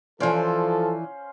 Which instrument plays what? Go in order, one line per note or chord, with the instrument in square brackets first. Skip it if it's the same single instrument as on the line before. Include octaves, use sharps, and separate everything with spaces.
[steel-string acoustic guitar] E3 D5 [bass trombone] F3 [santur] C#4 C5 F5 [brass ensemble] A4